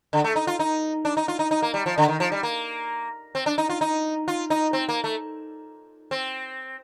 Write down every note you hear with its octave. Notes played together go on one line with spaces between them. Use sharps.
D3
A3
D#4
F4
D#4
D4
D#4
F4
D#4
D#4
A#3
G3
F3
D3
D#3
F3
G3
A#3
C4
D4
D#4
F4
D#4
F4
D#4
C4
A#3
A3
C4